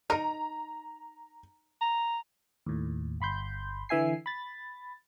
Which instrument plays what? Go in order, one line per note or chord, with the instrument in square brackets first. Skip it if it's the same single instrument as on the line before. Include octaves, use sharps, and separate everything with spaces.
[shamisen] D#4 A#4 [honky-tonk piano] A#5
[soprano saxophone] A#5
[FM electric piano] D#2 A2
G1 B5 C6 G6
D3 E3 E5 G#5 C7
B5 A6